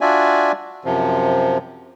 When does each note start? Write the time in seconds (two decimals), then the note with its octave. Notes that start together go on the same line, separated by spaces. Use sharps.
0.01 D4 F4 F#4 D5 E5 G#5
0.85 F#2 C3 F3